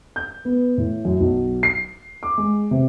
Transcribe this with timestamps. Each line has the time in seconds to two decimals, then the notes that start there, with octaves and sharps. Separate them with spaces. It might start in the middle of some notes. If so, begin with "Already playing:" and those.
0.16 G6
0.45 B3
0.78 A2
1.05 F#2
1.20 B1
1.63 C7
2.23 D6
2.38 G#3
2.71 C3